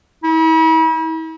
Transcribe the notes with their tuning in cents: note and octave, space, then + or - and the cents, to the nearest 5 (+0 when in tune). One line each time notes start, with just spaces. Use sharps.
E4 -40